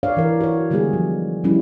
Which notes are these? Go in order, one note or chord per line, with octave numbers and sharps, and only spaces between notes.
D4 C#5 D5 F5
E3 A#4
F#4 C#5
D3 G3 G#3 B3 F#4 G#4
F3
F3 G3 C#4 E4